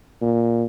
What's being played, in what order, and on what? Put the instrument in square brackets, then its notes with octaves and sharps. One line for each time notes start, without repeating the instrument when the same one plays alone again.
[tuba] A#2